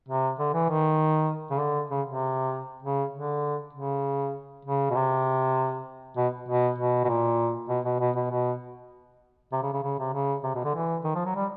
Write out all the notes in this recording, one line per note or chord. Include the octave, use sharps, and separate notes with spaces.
C3
D3
E3
D#3
C#3
D3
C#3
C3
C#3
D3
C#3
C#3
B2
C3
B2
B2
B2
B2
A#2
B2
B2
B2
B2
B2
C3
C#3
C#3
C#3
C3
C#3
C3
B2
D3
E3
D#3
F3
F#3
G3